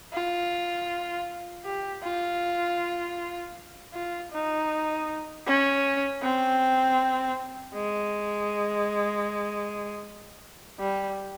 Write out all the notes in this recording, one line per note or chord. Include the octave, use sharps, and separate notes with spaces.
F4
G4
F4
F4
D#4
C#4
C4
G#3
G3